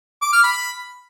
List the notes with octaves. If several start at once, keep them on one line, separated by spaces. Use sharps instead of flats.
D6
F6
B5